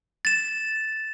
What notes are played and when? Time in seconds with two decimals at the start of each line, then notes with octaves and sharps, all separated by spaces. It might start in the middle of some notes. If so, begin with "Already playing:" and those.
0.25 A6 E7